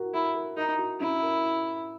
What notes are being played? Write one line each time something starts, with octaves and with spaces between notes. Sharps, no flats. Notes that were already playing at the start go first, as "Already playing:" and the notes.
Already playing: F#4 A#4
E4 A#4
A#4
D#4 A#4
F#4
C#4 E4
A#4